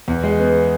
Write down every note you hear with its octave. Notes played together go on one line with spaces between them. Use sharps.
E2
G#3
B3